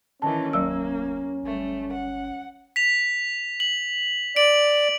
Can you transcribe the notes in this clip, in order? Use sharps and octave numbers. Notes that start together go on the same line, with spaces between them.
D#3 E3 C#4 A5
F1 D2 F#3 A#3 E6
G1 G3 A3
F#5
B6 F7
F#7
D5 D7 F#7